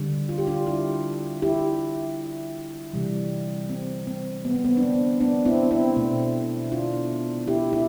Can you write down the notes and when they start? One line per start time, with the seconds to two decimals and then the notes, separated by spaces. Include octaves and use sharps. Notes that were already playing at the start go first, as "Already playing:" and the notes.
Already playing: D3 G3
0.29 F4
0.38 G4
0.47 D4 F4
0.67 E4 G4
1.42 E4 G4
2.94 C3 E3 G3
3.70 C4
4.07 C4
4.45 B3
4.55 C4
4.65 B3
4.77 D4
4.83 C4
5.21 B3 D4
5.45 C4 E4
5.71 C4 E4
5.96 B2 A3
6.72 D4 F4
7.47 E4 G4
7.73 E4 G4